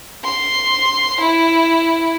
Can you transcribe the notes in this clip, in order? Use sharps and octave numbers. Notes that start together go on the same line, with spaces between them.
C6
E4